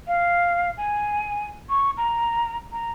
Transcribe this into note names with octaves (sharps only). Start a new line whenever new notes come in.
F5
G#5
C#6
A#5
A#5